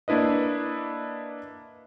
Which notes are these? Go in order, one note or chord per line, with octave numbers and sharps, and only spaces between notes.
A#3 D4 E4 B4 D#5